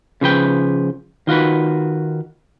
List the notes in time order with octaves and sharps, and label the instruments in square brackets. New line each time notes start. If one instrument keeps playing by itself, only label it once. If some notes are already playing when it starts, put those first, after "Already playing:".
[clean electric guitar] C#3 F3 B4 G5
D#3 F4 F#4 B4